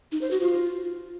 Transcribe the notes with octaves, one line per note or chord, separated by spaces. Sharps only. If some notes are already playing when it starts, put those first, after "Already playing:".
D#4
C5
F#4
F4